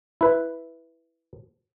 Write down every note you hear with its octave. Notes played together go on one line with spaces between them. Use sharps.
E4 B4